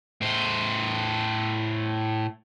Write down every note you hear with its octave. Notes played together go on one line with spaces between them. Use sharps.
A2 C5